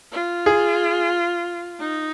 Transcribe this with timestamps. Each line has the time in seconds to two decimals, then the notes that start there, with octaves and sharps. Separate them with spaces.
0.12 F4
0.46 G#4
1.79 D#4